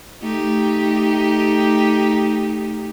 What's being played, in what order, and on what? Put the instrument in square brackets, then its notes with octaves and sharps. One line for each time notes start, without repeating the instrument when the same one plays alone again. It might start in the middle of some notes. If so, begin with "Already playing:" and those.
[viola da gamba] A3 D#4 G4